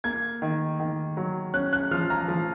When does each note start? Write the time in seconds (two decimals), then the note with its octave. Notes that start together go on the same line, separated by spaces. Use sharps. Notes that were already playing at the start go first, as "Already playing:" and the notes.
0.04 A#3 G#6
0.42 D#3
0.80 D#3
1.17 F#3
1.54 C#4 F#6
1.73 F#6
1.91 F3 F6
2.10 A#5
2.28 F3